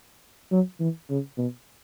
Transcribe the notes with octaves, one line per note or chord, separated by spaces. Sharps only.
F#3
E3
C#3
B2